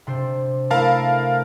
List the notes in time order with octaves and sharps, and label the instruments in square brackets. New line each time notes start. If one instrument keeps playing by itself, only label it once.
[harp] C3 D4 C5
[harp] A3 E4 [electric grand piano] A#4 F5 A5